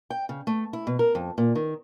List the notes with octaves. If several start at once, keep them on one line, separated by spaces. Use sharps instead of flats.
G5
C#3
A3
E4
B2
A#4
F2
A#2
D#3